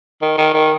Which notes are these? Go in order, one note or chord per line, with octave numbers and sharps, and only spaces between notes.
D#3
D#3
D#3